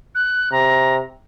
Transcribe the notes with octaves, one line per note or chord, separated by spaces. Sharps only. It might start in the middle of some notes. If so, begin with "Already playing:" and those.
F#6
C3 A#5